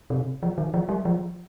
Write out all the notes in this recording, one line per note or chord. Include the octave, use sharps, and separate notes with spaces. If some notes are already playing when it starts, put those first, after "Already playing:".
C3
F3
D#3
F3
G3
F3